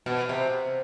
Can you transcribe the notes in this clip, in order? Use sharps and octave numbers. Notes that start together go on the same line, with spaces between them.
B2
C3